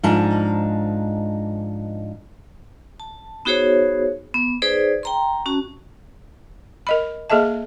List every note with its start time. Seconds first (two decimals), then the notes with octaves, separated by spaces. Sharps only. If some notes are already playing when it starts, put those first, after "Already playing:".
0.03 G#2 F3 D4 D#4 A#5
3.00 A5
3.45 B3 D#4 F#4 G#4 C5 C#5
4.34 B3
4.62 D#4 G#4 B4 C5 D5
5.03 G5 A#5 C6
5.46 C#4 F#4 A5
6.87 A#4 D#5 B5
7.30 A#3 G#4 A4 D#5 E5 A5